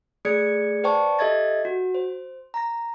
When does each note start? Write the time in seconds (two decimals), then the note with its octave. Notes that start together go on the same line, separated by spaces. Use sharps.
0.25 A3 G#4 D5 G#6 C#7
0.84 B4 C5 D5 G5 A5 C#6
1.19 G4 A4 D#5 E5 G#6 A6
1.65 F#4
1.95 C5
2.54 A#5 A#6